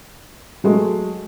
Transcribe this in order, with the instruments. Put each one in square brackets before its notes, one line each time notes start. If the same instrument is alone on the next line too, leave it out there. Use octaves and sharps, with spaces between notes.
[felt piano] F#3 G#3 A3